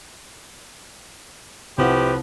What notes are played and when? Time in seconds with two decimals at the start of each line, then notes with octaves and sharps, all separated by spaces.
1.78 C2 A2 F3 G4 B4 F#5